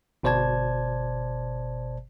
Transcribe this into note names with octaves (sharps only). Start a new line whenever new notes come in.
G1 B2 C5 D5 A5 G#6